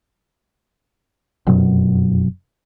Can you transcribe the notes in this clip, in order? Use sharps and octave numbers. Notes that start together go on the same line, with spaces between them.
F1 F#2 B2 F#3